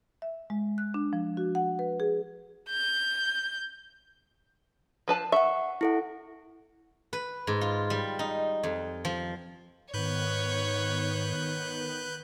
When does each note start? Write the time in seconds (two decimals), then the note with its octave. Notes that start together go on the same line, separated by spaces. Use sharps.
0.22 E5
0.50 G#3
0.78 F#6
0.94 D4
1.13 F3
1.37 F#4
1.55 F#5
1.79 B4
2.00 G#4
2.70 G6
5.08 F3 B4 A5
5.32 E5 F#5 C#6
5.81 E4 A4 F#5
7.13 B4
7.47 G#2
7.61 F4
7.90 G3
8.19 D#4
8.63 F2
9.05 F3
9.94 G#2 D#3 B3 B4 C#5 F#6 G6